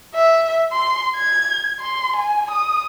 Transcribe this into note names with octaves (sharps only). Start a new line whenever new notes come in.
E5
C6
G#6
C6
G#5
D#6